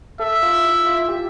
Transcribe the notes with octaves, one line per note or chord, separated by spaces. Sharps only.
A4 E5
F4
E4
F4
G4